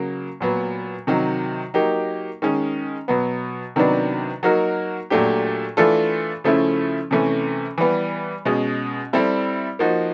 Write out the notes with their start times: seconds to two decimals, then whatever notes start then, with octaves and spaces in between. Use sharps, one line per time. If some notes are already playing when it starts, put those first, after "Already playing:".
Already playing: C#3 F#3 A#3
0.41 A#2 F#3 B3
1.07 C3 D#3 F#3
1.74 F#3 A#3 D#4 G4
2.42 D#3 G#3 C#4
3.08 B2 F#3 B3
3.76 C3 D#3 F#3 B3 D4
4.43 F#3 A#3 D#4 F#4 A#4
5.10 A#2 F#3 A3 D4 G4
5.77 E3 A3 D4 F4 A4
6.44 C#3 F3 A3 C#4 E4
7.11 C3 E3 A3 C#4
7.78 E3 G3 B3
8.45 B2 G#3 C#4
9.13 G3 C4 E4 A4
9.79 F3 A#3 D#4 F#4